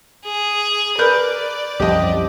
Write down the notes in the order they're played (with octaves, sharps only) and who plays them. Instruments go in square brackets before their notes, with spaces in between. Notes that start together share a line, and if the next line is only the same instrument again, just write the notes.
[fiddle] G#4
[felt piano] A#4 B4 G6 [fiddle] D5
[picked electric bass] C2 F#2 F3 [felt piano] G4 D#5